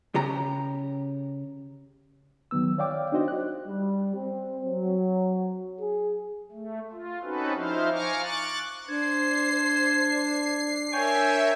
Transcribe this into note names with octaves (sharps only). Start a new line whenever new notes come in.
C#3 G4 A#5
D#3 F#3 B3 E6
C#5 D5 F5 G5 D6
D4 D#4 F#4 C5 D#5
F#4 F#6
G3
C4
F#3
G#4
A3
F4
C4 C#4 D#4 F#4 A4 B4
F3 D#4 E4 C5 F5
F5 G#5 A#5 C#6 D6 F6
C#6 D6 F#6 A6
D4 C5 G#6 C7
A#4 C#5 E5 G5 G#5 C#6